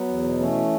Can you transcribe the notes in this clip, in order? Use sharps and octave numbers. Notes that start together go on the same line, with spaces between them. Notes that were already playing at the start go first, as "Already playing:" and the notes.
Already playing: F#3 B3
E2
B2
E3 A3 C#4